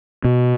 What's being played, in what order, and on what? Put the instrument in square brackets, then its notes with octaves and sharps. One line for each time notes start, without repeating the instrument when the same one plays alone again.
[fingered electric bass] B2